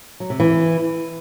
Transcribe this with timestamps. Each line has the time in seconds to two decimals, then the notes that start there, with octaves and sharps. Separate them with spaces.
0.20 F#3
0.30 C3
0.40 E3